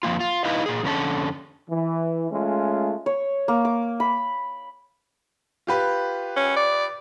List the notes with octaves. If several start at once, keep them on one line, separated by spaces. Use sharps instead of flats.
F2 D#3 A#3 F4
F4
D#4 E4 B4 D#5 F5
A#2 G#4
F2 D3 A#3 C#4 A4
E3
G#3 A3 C#4 F4
C#5
A#3
D6
B5
F4 G4 B4
C#4
D5